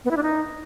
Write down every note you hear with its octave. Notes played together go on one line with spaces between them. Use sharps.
B3
E4
D4
D#4